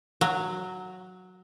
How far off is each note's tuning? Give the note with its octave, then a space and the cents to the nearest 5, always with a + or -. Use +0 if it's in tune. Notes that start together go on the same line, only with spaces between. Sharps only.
F#3 -5